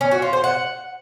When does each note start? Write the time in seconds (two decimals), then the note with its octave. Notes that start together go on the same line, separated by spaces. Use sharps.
0.01 C#4
0.11 F#4
0.22 F4
0.33 C5
0.44 F#5